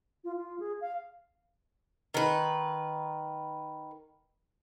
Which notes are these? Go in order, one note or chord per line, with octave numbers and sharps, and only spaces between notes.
F4
F4
G#4
F5
D#3 B4